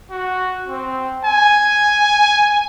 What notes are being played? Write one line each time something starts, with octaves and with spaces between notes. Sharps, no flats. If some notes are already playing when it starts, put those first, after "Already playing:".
F#4
C4
G#5